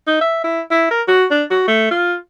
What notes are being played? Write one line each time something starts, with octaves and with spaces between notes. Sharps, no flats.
D#4
E5
E4
E4
A#4
F#4
D4
F#4
A3
F4